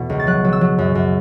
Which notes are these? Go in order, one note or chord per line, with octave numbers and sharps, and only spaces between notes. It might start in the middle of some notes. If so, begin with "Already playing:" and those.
Already playing: E2 B2 A3
C#2
A6
F#3 F#6
F#3
E6
F#3
F#2
F#2